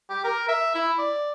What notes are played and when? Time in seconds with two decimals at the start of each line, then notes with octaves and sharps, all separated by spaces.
0.10 G4
0.24 A#4
0.48 E5
0.75 E4
0.98 D5